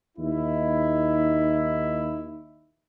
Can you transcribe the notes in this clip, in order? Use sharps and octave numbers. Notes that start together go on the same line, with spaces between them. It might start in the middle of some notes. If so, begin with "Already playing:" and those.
D#2 D#4 E4